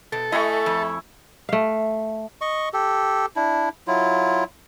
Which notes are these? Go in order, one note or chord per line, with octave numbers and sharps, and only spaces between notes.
B2 A4
A3 E4 D#5 G#5 C#6
F2
A3 F5
D#5 C#6
G4 A4
D4 E4
F#3 E4 F4